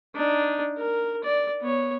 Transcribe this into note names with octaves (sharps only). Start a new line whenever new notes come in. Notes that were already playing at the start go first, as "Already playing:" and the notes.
D4 D#4
A#4
D5
B3 C#5